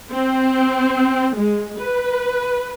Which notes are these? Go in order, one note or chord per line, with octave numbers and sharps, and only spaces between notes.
C4
G#3
B4